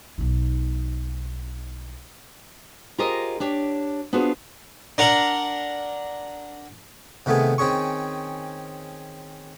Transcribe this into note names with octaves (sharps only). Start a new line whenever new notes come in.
B1 D#4
F4 G4 G#4 A#4 C5 D#5
D4 G4 C#5
B3 D4 F4 F#4 G#4 C5
D4 A#4 F#5
C3 D#3 A3 B3 G#4
D#3 C4 C#4 G#4 C#6